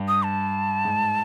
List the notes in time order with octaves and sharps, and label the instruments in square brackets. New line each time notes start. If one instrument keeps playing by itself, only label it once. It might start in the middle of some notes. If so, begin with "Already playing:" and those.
Already playing: [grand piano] G2
[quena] D#6
A5
[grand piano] G#2